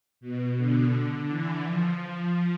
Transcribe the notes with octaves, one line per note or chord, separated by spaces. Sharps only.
B2
D3
E3
F3